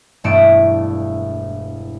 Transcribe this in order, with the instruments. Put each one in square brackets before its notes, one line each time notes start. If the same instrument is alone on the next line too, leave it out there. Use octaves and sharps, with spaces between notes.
[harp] E1 G2 A3 C#7 D7 E7